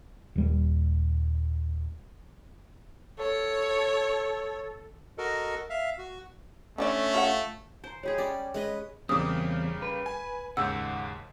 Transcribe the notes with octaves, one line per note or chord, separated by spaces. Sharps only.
D#1 G3
A4 C#5
F#4 A4 A#4 D#5
E5 F5
F#4
D3 E3 A3 C#4 D5
F4 E5 F#5
C5 G#5 A#5
G#3 G4 G#4 C#5 B5
G3 C#4 D5
G#3 C#4 B4 D#5
E2 G2 C#3 G3 A#3 C4 D6 D#6
B4
G#5
D#2 G#2 C#3 F#5 E6 G6